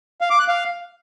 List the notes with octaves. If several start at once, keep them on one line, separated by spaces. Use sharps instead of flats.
F5
D6
F#6
F5